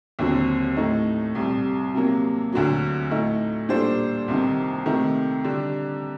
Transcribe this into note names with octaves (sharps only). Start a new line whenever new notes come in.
D#2 D3 F#3 C4
A2 A3 D#4
C2 C3 G3
C3 F#3 A#3
D2 D3 F#3
A2 A3 D#4
A#2 G3 D4 A4 C5
C2 C3 D#3
C3 D#3 A3
D3 G3 D4